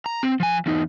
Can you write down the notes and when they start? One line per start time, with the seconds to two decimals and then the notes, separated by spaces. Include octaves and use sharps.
0.06 A#5
0.23 C4
0.40 F3 G#5
0.66 E2 D#4